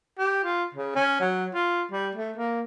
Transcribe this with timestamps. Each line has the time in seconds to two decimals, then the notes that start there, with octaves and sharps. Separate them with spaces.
0.18 G4
0.44 F4
0.74 C#3
0.95 C#4
1.20 F#3
1.54 F4
1.91 G3
2.15 A3
2.37 A#3